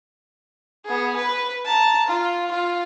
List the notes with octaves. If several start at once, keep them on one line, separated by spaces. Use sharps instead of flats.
B3 G#4
B4
A5 A#5
F4
F4